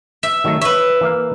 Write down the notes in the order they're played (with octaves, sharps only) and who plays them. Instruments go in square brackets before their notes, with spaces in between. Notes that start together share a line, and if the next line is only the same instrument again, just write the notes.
[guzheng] E5
[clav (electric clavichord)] D#3 F#3 A3
[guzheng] B4 E5 [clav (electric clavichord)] C#5
[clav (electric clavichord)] E3 A#3 F5